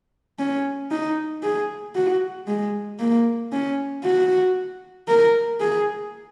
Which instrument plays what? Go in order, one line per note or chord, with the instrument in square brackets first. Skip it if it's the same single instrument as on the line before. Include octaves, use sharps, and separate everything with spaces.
[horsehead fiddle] C#4
D#4
G#4
F#4
G#3
A#3
C#4
F#4
A#4
G#4